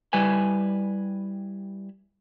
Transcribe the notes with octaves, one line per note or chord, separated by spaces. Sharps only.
G3 E4 B4 G#5